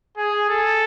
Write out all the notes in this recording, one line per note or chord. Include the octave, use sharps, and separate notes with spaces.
G#4
A4